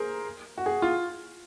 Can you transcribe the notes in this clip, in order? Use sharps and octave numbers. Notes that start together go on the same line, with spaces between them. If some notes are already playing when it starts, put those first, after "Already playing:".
Already playing: G#4 A#4 C5
F#4
G#4
F4